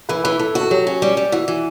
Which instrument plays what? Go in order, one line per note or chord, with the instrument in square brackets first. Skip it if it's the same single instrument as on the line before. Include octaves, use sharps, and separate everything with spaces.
[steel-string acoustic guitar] E3 [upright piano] B4
[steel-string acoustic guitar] E3 [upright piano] B4
[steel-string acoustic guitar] E3 [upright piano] A4
[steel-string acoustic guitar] F#4 [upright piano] A4
[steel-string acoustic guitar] F#3 [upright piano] G4
[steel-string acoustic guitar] C#4
G3
G3
[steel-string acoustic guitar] E3 [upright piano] F#4
[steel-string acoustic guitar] E3